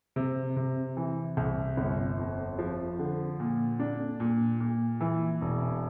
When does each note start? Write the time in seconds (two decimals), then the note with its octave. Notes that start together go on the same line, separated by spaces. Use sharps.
0.16 C3
0.56 C3
0.97 E3
1.37 C2
1.77 G1
2.18 F2
2.59 F3
2.99 D3
3.40 A#2
3.80 D4
4.20 A#2
4.60 A#2
5.01 E3
5.41 E1